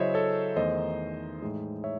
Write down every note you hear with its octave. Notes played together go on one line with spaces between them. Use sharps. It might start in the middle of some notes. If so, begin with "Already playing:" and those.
Already playing: C#3 F#3 C#4 E4 C5 C#5 D#5 E5
A4 C#5
E2 D#3 A3 D#4 C5 D#5
A2 E3 G#3 D#4
C#5 E5